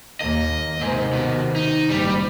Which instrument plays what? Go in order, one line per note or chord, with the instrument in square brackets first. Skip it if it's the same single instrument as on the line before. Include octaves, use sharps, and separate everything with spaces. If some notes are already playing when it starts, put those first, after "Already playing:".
[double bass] D#2 A#3 [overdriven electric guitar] D#5
[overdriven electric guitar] G#2 [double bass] C3 D#3
[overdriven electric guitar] B2
D#4
[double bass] F#1 G#2 [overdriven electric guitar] G3